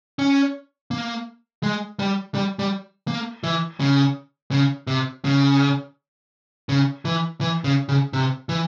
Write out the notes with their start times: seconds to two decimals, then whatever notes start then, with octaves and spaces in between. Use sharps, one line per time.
0.19 C#4
0.91 A#3
1.63 G#3
1.99 G3
2.35 G3
2.59 G3
3.08 A#3
3.44 E3
3.80 C#3
4.51 C#3
4.87 C3
5.25 C#3
6.69 C#3
7.05 E3
7.41 E3
7.64 C#3
7.89 C#3
8.13 C3
8.49 E3